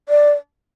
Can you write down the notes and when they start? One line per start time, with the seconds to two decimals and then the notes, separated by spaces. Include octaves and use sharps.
0.09 D5